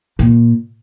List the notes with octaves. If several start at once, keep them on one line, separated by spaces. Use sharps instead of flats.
A#2